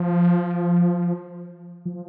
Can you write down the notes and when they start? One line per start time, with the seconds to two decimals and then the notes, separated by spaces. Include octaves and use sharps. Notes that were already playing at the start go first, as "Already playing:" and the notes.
Already playing: F3
1.86 F3